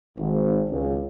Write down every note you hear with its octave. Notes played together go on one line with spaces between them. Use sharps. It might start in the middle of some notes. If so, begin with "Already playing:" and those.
G#1
C#2